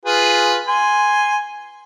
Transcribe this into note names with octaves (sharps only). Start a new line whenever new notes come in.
F4 G#4 B4
G#5 C6